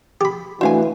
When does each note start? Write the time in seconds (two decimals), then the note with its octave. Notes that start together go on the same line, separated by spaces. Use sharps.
0.21 G4 B5
0.61 E3 A3 D4 F#4 C5 F5 G#5